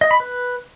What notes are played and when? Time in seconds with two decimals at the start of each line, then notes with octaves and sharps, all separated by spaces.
0.01 D#5
0.11 B5
0.20 B4